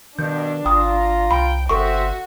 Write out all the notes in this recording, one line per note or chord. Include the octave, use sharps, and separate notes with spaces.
G2 B2 D#3 D4 G6
G#1 F4 G5 A#5 D#6
C2 G5 B5
G1 C4 F#4 A4 C5 E5 C#6